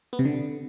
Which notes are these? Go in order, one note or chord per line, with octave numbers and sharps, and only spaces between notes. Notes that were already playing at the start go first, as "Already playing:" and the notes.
B3
C3
D3